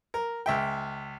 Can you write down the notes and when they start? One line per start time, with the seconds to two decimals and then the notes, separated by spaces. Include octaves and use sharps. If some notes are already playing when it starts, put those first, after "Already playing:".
0.14 A#4
0.46 C#2 E5 G5